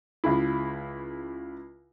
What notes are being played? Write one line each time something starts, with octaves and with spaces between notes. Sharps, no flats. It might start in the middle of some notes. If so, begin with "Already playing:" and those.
C#2 C#3 E4